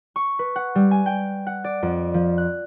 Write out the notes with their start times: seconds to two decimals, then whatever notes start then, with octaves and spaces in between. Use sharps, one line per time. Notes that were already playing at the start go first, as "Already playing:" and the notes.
0.16 C#6
0.39 B4
0.56 F#5
0.75 G3
0.91 G#5
1.06 G5
1.47 F#5
1.64 D5
1.83 F2
2.14 F3
2.38 F#6